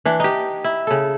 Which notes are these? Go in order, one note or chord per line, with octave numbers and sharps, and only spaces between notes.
E3 D4
D#4 G4
E4
C#3 A4